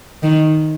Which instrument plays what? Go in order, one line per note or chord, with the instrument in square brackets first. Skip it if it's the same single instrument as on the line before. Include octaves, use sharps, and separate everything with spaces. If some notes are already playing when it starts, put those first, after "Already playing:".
[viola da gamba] D#3